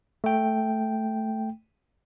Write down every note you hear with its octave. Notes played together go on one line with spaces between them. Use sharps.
A3 G5